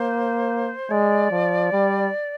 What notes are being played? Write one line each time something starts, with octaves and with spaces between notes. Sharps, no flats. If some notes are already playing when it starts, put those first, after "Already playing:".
Already playing: A#3 C5
G#3 D5
F3
G3